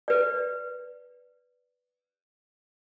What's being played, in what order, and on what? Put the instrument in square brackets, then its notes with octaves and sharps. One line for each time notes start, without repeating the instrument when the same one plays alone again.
[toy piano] B4 D5